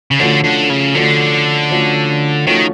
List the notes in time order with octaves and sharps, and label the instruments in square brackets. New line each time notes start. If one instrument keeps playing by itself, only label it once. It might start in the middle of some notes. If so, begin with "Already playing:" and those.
[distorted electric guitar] C#3
[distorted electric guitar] D3 [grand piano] F3 A3 C#4 F#4
[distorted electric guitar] D3
C#3
[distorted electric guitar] D3 [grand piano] F3 A3 C#4 F#4
[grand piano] F3 A3 C#4 F#4
[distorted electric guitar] D#3 [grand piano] F3 A3 C#4 F#4